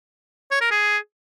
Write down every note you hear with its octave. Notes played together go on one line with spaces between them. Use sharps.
C#5
A#4
G#4